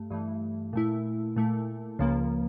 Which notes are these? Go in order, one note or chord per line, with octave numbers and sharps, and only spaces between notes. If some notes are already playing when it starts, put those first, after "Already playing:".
Already playing: G2 A3
G2 E3 A3
A#2 A3 E4
A#2 A3 E4
C#2 C#3 F3 A#3